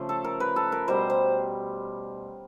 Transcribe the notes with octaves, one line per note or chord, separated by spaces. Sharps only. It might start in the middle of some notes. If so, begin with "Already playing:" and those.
Already playing: C#3 F3 A3
A4
A#4
B4
A4
A#4
B2 G3 C5
C5